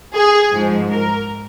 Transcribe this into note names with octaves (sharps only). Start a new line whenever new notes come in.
G#4
G#2 F3
A#4